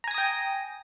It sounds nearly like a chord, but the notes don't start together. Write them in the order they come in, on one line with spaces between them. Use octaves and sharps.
A#5 G#5 A#6 D#6 G5